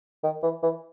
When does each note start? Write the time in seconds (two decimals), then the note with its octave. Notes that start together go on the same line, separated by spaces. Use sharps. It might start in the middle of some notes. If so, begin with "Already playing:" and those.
0.24 D#3
0.43 E3
0.63 E3